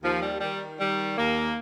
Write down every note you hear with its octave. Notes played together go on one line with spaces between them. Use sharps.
D#2 F3
G3
D#3 G3
D#3 G3
D#2 A#3